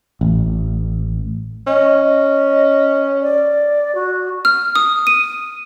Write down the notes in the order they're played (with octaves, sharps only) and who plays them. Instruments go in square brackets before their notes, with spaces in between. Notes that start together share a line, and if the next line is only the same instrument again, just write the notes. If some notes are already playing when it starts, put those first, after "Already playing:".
[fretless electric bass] A1
[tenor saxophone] C#4 [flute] D#5
[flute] D#5
D5
F#4
[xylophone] F6
D#6
D#7